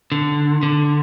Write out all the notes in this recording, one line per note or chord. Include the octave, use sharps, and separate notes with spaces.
D3
D3